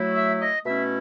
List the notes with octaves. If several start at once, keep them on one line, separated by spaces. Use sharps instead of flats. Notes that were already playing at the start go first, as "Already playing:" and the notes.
Already playing: F#3 A3 E4
E5
D#5
B2 A3 C#4 E4 E5